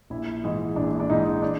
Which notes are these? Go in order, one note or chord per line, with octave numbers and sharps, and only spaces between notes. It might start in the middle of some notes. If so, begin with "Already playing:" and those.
A#1 E4
G#2 E3 G#3
A#1 D4
D4
G#2 E3 G#3 D#4
D4